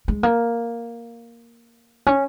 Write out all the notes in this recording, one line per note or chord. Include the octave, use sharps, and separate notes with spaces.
G#3
A#3
C#4